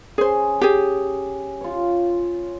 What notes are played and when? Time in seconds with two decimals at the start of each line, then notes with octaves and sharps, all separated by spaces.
0.18 C#4 G#4 C5
0.61 G4 G#4
1.61 F4 C#5